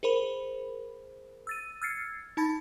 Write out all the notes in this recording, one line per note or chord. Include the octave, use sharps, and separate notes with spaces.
G#4 A#4 C5 B5
E6 A6 D#7
E6 F6 G#6 A6 C7 C#7
D#4 A5 B5 A6